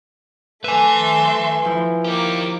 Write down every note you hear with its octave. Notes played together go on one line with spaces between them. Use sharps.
A3 B4 E5 G#5 C6
F3 E4
A#3 D#4 G4 D6